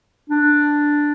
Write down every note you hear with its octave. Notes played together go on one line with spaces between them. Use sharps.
D4